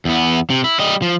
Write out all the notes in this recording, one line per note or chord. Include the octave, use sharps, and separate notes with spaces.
E2 B3
C3
E4
G3 D#5
F3